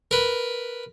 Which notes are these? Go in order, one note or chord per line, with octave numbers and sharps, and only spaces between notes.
A#4 B4